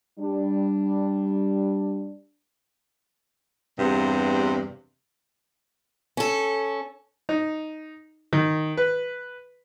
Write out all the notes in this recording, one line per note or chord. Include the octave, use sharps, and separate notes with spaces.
G3 D4
E2 G2 C3
C#4 A4
D#4
D#3
B4